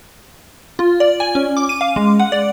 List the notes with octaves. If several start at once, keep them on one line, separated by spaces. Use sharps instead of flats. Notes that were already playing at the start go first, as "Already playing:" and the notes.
F4
D5
G#5
C#4
D6
D#7
F5
G#3
F#5
D5